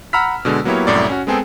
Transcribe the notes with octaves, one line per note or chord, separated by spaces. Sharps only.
F#5 A#5 B5 E6 F6 B6
B2 D3 G#3
F#3 A#3 B3 E4 G4 C#5
C2 F#2 A2 D5
C#4 F#4
G#3 B3 C4 G#4 A4 G5